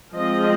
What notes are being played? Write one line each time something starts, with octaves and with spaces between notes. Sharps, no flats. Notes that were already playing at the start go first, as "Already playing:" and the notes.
F3 G#3 C4 D#5